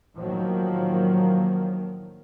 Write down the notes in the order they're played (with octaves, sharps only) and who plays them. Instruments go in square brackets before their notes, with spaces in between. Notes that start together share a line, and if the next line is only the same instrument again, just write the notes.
[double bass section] A2 D#3 F3 F#3 A#3